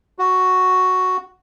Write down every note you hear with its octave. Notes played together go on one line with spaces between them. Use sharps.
F#4